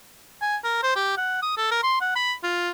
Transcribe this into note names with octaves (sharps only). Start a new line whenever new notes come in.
G#5
A#4
C5
G4
F#5
D#6
A4
A#4
C6
F#5
B5
F4